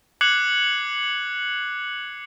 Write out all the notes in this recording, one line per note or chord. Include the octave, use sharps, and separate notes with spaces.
D6 F#6 G#6 C7 C#7 F#7